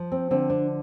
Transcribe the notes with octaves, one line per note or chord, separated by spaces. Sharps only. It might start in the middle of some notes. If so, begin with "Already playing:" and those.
Already playing: F3
C4
D3 C4
D4